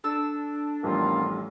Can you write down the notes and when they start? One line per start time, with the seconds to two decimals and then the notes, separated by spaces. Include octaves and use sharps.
0.04 D4 A4 E6
0.83 A1 F2 G3 A#3 B3 F4